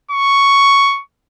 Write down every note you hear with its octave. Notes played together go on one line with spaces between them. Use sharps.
C#6